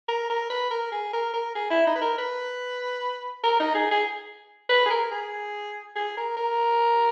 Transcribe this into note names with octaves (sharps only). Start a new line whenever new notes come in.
A#4
A#4
B4
A#4
G#4
A#4
A#4
G#4
E4
D#4
B4
A#4
B4
A#4
D#4
G#4
G#4
B4
G#4
A#4
G#4
G#4
A#4
A#4